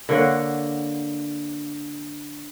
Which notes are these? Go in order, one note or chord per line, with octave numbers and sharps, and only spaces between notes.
D3 A#3 C#5 F#5